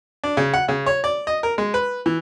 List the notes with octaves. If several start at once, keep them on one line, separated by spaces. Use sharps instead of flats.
D4
C#3
F#5
C#3
C#5
D5
D#5
A#4
G#3
B4
E3